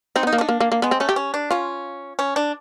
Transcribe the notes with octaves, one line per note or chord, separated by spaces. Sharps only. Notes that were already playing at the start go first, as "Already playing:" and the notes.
C4 D#4
B3
D#4
A#3
D4 D#4
A#3
A#3
A#3
G#3 B3
C4
A3 C#4
G4
C#4
D4
C#4 F4
C#4
D4